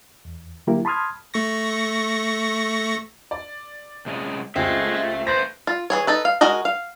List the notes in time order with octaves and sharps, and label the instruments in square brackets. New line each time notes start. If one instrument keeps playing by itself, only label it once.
[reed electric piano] E2
D3 F#3 A#3 E4 G4 A#4
A5 B5 C6 D#6 F6 G#6
[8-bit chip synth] A3 C#6 A#6
[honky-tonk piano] D5
[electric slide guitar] C3 G#3 C#4
[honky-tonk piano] C#2 G4 F#6 [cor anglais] G#3 [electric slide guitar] A3 E5 [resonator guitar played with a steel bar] C4
[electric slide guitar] A3 B4 [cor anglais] C5 [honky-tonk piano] A#6
[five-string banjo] F4
E3 G#4 C#5
D#4 A4 B4
F5
G#3 F#4 A#4 D#5
F5